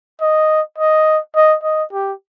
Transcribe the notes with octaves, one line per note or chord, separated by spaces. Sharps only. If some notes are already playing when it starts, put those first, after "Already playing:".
D#5
D#5
D#5
D#5
G4